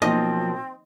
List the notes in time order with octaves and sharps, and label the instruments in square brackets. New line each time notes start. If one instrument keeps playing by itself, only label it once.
[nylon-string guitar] B2 F#3 A#3 [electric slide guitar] F3 [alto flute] C4 [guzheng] D#5